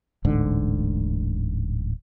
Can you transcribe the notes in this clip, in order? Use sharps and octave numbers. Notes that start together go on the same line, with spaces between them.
D1 A1 G#2 D3